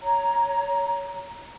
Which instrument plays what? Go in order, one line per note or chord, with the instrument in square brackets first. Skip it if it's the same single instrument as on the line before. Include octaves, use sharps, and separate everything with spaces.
[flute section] C#5 A#5